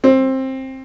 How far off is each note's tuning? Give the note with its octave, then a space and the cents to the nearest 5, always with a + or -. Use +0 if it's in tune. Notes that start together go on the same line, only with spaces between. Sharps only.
C4 +15